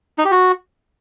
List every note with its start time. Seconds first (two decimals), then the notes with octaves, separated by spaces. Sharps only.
0.18 D#4
0.25 G4
0.31 F#4